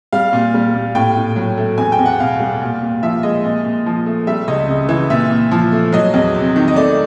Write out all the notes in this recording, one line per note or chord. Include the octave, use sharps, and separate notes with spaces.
G3 F5
A#2
G3
A#2
A2 G5
A2
F#3
A3
E2 G#5
G5
E2
F#5
B2 F5
G3
A#2
A#2
F3 E5
G#3 D#5
A#2
A#2
F3
A3
G3 E5
C#2 D#5
C#3
E3
A#2 E5
A#2
F3
A3
F#3 D#5
E2
C3
D#3
D#5
A3 D5